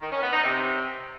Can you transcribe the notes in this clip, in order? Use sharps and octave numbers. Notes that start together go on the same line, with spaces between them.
D#3
C#4
B3
D#4
C3